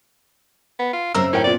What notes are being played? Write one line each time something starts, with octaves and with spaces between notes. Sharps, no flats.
B3
F4
F#2 C#3 C4 A#4 E6
A2 C#4 A#4 G5
A#2 B3 D5